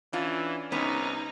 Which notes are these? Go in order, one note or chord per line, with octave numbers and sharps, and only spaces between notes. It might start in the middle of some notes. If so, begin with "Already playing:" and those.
E3 C#4 D4 F4
C2 B3 C#4 D#4